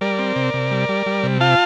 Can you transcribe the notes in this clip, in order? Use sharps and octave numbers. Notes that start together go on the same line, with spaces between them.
G3 A#4 D5
C4
C3
C3
G3
G3
G3
C3
F4 F5 A5